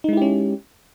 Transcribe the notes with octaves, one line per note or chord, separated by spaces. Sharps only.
G#3 C#4 D#4 E4 G4